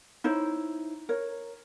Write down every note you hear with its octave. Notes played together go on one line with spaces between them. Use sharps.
D#4 E4 C5 C#5
A#4 C#5